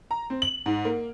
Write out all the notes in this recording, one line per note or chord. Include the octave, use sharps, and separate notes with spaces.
A#5
C4
F#7
G#2
A#3